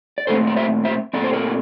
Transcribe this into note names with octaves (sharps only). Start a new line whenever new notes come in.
D5
A#2 A3 C4 A4 C5
D5
C5 E5
C5 E5
A#2 A3 C4 D5
C5
A#4 D5